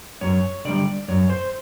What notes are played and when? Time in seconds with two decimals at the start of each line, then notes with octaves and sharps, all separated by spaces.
0.21 F#2 C#5
0.65 D3 G3 D5
1.08 F#2 C#5
1.30 C5